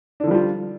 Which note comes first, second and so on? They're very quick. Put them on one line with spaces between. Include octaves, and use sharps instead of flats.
D4 D3 F3 G3 F4